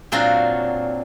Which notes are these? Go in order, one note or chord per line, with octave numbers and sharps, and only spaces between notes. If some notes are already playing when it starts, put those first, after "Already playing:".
A#2 F#3 C4 D4 F4 F#4